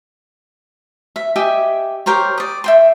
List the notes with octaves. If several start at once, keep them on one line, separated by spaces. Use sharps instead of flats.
E5
G4 D#5 E5 G#5
G4 A#4 C5 C#5
D5 D#6
E5 G5 C6